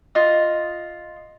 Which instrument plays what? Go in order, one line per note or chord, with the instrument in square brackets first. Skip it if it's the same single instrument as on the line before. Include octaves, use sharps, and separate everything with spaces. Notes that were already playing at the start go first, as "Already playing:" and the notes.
[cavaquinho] F4 D#5